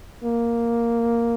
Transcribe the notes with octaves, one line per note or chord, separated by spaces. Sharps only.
A#3